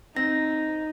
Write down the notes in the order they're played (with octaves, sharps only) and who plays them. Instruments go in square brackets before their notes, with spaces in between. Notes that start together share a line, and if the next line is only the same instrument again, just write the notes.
[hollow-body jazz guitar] C4 [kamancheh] D#4 [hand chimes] A#6